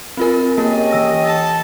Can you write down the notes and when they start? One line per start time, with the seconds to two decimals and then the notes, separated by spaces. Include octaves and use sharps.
0.17 C4 F4 A#4
0.58 A#3 C#4 G4 A#4 D#5
0.91 E3 E6 A#6
1.25 A4 A5